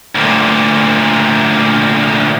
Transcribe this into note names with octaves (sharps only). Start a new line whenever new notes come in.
D2 A#2